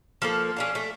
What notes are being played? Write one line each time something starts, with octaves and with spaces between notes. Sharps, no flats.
F3 A#3 A4
C#4 D4 F5
A3